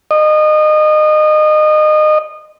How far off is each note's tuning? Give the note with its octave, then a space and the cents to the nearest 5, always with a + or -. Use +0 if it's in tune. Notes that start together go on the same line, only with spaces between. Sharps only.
D#5 -25